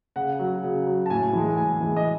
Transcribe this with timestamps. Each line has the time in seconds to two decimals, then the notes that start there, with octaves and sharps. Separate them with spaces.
0.16 C#3 F#5
0.39 F#3
0.63 C#3
0.87 F#3
1.06 A5
1.10 A2 G#5
1.33 E3 G#3
1.57 A2 G#5
1.80 E3 G#3
1.96 D#5